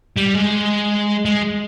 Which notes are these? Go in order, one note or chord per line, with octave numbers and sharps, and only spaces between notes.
G3
G#3
G#3